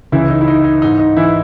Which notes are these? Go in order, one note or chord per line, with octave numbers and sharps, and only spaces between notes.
C#2 C#3 E3 E4
D#4
E4
D#4
D#4
G#2 E3 D#4
D#4
E3 E4